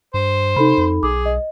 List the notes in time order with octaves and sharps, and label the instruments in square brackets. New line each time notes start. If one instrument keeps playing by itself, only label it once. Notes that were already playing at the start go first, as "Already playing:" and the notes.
[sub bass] G2 [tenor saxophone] C5
[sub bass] C3 [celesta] D#4 A4 B5
[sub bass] F2
[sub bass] B1 [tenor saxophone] G#4 [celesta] D6
[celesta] D#5